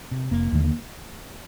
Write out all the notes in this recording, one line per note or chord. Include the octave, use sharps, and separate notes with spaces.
C3
F1 A#3
D#2 D3 A3
A#3